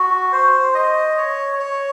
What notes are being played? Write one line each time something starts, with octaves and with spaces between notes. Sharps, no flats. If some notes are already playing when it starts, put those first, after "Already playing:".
Already playing: F#4
C5
D#5
C#5
C#5